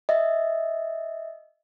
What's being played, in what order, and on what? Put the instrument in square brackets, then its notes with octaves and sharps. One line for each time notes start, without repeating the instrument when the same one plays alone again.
[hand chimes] D#5 E5